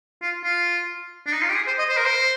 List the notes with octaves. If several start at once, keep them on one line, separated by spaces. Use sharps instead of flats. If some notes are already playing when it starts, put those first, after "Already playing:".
F4
F4
D4
D#4
F4
G4
G#4
C5
D#5
C5
A#4
C5